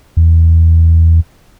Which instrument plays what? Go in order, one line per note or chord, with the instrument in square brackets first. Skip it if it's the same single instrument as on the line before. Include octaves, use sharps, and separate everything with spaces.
[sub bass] E2